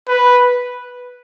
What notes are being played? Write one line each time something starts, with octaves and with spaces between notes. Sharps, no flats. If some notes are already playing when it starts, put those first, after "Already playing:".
B4